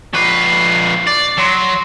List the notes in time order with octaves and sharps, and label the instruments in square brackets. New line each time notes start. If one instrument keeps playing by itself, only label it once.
[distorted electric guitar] F2 B4 [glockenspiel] C#6 D6 C7
[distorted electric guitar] D5
[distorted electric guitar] F#3 [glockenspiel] C6 D7